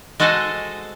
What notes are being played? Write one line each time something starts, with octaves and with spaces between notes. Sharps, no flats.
G#3 F#4 A4 C5 D#5 G#5